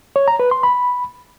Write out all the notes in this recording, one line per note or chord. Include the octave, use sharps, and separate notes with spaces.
C#5
A#5
B4
C6
B5